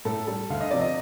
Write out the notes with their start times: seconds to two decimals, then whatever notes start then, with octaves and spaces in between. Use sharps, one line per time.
0.05 A2 A4
0.27 G3 A4
0.50 D2 F5
0.61 D#5
0.71 C3 F3 D5
0.81 D#5